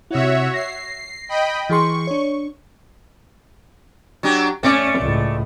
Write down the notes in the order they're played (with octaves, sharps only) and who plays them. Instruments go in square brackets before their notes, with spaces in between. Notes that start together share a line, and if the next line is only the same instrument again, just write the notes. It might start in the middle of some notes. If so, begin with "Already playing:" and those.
[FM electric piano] C3 E4 [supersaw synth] F#4 C#5 E5
[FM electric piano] A#6 [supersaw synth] C7
[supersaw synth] D#5 G5 B5
[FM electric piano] E3 G#4 C6 [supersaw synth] C#6
[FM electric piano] D4 C#5
[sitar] F#3 D4 G4
[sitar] A3 D5 [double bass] C#4
[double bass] C#2 A2